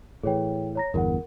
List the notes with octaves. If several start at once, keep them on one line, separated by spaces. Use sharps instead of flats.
A2 E3 G#4 C#5 G5
C#5 A#5 A#6
G1 E2 A#4 F#5